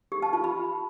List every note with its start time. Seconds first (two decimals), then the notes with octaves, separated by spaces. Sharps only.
0.12 G4
0.22 A5
0.33 F4
0.44 B5